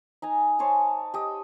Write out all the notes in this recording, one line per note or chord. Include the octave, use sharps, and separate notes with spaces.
D#4 G#5 A#5
C5 C#5 G#5 A5
G4 D#5